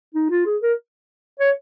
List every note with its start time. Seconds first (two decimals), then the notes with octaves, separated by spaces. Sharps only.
0.14 D#4
0.30 F4
0.46 G#4
0.62 A#4
1.40 C#5